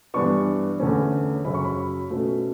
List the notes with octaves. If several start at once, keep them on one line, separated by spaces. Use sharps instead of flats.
G2 E3 B3 D4 C#6
E2 D3 A3 C#4
F#2 C#3 F#3 C#4 B5
C#6
B5
B2 A3 C#4